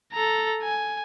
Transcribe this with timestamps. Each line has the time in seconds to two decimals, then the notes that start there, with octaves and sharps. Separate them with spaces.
0.13 A4 A#5
0.62 G#5